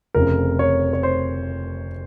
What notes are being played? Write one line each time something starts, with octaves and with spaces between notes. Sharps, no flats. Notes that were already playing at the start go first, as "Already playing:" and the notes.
F1 F2 C#3 A#4
C#5
C#5
C5